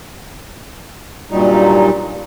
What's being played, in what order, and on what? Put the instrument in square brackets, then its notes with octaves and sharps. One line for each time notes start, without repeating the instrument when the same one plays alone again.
[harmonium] G2 A#2 F#3 G3 D#4